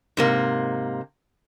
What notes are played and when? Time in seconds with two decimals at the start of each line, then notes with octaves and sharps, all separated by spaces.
0.17 G#2 C3 A#3